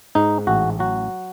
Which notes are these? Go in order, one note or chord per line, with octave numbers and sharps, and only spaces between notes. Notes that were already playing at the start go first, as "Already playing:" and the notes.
G#2 D#4
A1 F#4
F#3 F#4